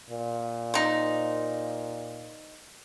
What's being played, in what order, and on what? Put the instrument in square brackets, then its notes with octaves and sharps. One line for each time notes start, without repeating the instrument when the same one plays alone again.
[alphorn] A#2
[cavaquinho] D#4 C5